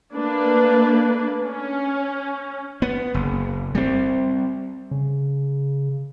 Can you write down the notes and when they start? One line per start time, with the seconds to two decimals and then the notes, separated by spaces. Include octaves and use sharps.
0.14 A3 A#3 D4 B4
1.43 C#4
2.82 B3
3.14 F#1
3.75 G3 C4
4.91 C#3